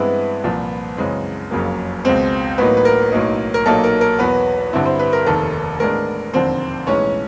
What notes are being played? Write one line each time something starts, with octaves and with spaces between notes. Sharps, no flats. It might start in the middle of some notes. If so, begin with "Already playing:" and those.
Already playing: G2 E3 G#3 B3 C4 E4 B4
C2 A#2 F3
F#2 C#3 E3 G#3 C4
F#1 F2 C#3 F#3 A#3
C#2 B2 G#3 C4 C5
A1 A2 F#3 A#3 B3 D#4 B4
B4
A#4
B1 A2 F#3 A#3 D#4
A#4
B1 A#2 F#3 A#3 D#4 A4
A#4
A#4
E2 B2 F#3 B3 B4
G2 D3 G3 C4 E4
C5
B4
A#4
F1 D#2 D#3 A4
A2 E3 G#3 B3 D4 A#4
E1 D#2 D3 F3 C4 C5
B1 A2 E3 G#3 C#4 C#5